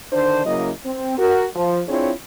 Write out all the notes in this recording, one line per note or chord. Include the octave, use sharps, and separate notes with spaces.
D3 D#3 D4 C5
C#3 F#3 A#3 E4 D#5
C4
F#4 A#4
F3
C4 D4 E4 F4 G#4 C#5